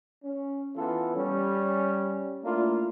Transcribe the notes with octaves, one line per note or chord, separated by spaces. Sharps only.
C#4
E3 B3 F4 A4
G3 C#4
A3 A#3 D4 E4 F4